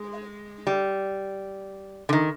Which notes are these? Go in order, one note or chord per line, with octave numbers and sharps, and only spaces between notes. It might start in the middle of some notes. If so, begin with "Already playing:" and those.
Already playing: G#3
G3
D3
D#3